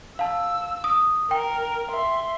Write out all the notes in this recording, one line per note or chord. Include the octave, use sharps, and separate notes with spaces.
F5 A5 E6
D#6
A#4 G5
E5 C6